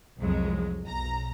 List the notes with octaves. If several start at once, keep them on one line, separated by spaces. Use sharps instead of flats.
C2 F2 F#3 G#3
B1 A#5